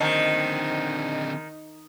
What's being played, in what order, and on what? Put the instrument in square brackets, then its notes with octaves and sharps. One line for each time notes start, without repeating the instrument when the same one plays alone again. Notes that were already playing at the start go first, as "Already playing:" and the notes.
[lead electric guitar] D3 C4 [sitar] D#3 [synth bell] D#5